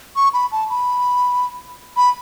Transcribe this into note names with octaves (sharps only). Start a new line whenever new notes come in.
C#6
B5
A5
B5
B5